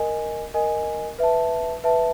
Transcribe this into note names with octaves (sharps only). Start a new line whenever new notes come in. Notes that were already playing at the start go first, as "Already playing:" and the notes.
Already playing: A#4 D#5 G#5
A#4 D#5 G#5
B4 E5 A5
B4 E5 A5